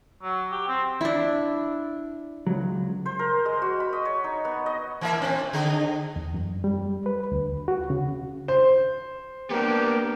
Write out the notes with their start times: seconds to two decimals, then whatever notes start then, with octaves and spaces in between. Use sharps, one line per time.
0.23 F#3
0.51 G4
0.68 C4
1.01 D4 E4
2.47 C#2 F#3
3.06 C5
3.19 A#4
3.45 G#3
3.62 F#4
3.80 B5
3.93 D#5
4.05 C#5
4.24 D#4
4.45 B3
4.66 D#5
5.01 E3 A#3 E5
5.18 A#2 C4
5.53 D3 D#4 G#4
6.16 E2
6.34 F#2
6.64 G3
7.06 B4
7.32 D2
7.68 F#4
7.90 C#3
8.48 C5
9.50 A#3 B3 D4 G4 A#4